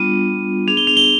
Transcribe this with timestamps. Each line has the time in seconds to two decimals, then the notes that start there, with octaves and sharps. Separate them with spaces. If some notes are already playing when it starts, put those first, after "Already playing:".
Already playing: G3 B3 D4 F4 D#7
0.67 B3 D4 G#4 F7
0.77 G7
0.87 F7
0.97 G7